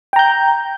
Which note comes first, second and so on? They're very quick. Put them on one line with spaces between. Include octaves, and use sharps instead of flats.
G5 A#5 G6